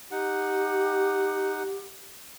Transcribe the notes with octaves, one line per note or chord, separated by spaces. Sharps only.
D#4 G4 F#5